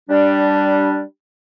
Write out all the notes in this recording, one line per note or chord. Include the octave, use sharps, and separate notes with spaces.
G3 D4